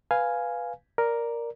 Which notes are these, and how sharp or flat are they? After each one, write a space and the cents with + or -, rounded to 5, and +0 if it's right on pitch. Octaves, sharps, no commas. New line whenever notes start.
B4 +0 F5 +0 G#5 +0
A#4 +0 D5 +0